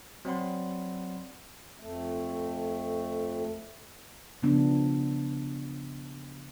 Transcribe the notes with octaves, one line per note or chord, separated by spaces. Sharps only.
F#3 C4 D5 F#5 B5 C6
F2 A3
C#3 F3 B3 D4